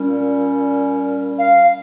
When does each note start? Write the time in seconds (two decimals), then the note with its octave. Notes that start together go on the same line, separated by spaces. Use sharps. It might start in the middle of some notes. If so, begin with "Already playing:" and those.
Already playing: A#2 G3 C#4
1.38 F5